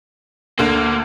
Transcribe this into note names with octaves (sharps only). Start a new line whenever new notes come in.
D2 D3 A#3